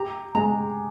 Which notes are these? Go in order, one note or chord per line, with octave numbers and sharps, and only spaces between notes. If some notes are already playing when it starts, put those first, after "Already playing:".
Already playing: G4 A#5
G#3 A#5